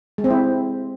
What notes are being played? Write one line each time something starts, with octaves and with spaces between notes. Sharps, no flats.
G#3
C4
E4